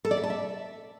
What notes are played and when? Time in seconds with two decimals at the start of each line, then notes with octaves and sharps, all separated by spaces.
0.05 A4
0.11 D5
0.17 E5
0.24 A5
0.30 E5